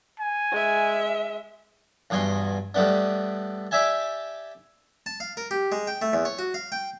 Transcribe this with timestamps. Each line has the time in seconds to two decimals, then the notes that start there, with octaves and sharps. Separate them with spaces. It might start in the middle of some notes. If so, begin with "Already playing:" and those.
0.20 G#5
0.52 G#3 E5
2.10 E2 G2 B2 G#5 C6
2.74 A2 G3 A3 B3 D4
3.71 G4 D5 E5 G#5 A5
5.06 A5
5.20 F5
5.37 A#4
5.51 G4
5.72 G#3
5.87 G5
6.02 A3
6.13 E2
6.25 C#5
6.39 F#4
6.54 F5
6.72 G5